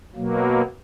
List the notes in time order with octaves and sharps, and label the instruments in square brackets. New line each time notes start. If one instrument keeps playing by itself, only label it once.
[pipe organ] B2 F#3 A#3